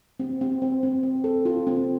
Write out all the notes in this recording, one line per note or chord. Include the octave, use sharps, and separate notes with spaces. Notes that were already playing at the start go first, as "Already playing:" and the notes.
C4
C4
C4
C4
C4
A4
F4
C4